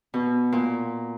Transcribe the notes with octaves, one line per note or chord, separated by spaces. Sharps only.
B2
A#2